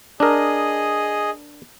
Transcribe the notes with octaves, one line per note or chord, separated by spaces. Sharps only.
D4 G#4 A#4 D#5